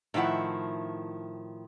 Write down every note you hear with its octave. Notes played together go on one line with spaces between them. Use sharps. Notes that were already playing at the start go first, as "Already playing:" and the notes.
A2 D#3 F3 E4 F#5